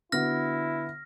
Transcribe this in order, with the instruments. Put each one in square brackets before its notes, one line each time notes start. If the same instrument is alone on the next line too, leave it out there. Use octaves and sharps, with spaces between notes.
[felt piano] D3 B3 F#4 [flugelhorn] E4 [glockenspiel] F6 A#6